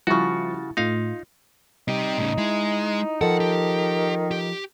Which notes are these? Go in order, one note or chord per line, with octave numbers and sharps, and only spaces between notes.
C#3 F3 G3 E4 F#4 C#6 A6
A2 A3 D#4 F4 F5
C3 G3 D#4 G4
A2 C#3
G#3 E4
D#3 F3 A4 F#5
G4
G4